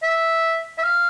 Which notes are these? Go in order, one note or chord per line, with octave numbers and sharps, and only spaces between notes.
E5
E5
F5